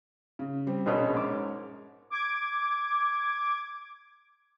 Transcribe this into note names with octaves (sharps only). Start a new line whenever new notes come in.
C#3
G3 C4
A#1 B2 C#4 G#4 A#4 C#5
G#2 D6
D6 G#6